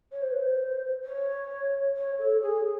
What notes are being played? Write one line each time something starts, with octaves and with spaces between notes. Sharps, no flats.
C#5
C5
B4
C5
C#5
C#5
A4
G#4